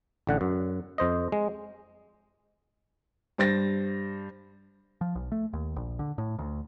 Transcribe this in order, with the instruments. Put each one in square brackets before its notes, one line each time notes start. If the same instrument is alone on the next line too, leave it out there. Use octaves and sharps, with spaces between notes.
[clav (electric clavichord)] A1 D3 F#5
F#2
F2 C5 D#5
G#3
[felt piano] G2 C5 A6 A#6
[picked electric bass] F3
B1
A3
D#2
A#1
D3
A2
D2